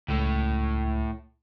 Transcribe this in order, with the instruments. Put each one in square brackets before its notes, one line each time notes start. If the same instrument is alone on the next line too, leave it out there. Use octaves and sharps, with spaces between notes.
[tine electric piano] C#2 [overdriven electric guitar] A2 A3